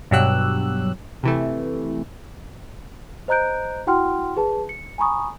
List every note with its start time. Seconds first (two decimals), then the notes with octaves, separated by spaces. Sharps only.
0.11 G2 B2 F#3 G4 E6 F#6
1.23 C3 E3 A3
3.28 C5 D#5 A#5 F#6 G6 D7
3.87 E4 F#4 F#5 G5 C6 F6
4.37 G#4 B4 A5
4.69 C#7
4.98 G#5 A#5 B5 C#6 D#6